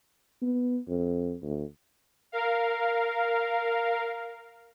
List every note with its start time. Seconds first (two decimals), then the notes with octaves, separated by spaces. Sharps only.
0.42 B3
0.88 F2
1.43 D2
2.32 A#4 F5